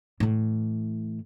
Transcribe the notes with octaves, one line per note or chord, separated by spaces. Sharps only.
A2 E3